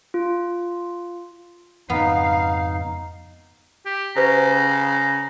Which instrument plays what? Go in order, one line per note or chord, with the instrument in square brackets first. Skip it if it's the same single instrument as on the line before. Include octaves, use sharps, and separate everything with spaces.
[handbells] F4
[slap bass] F2 G#2 C#3 [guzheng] B3 [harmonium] D#4 [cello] F5
[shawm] G4
[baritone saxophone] C#3 [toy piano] G4 B4 C5 [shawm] A#5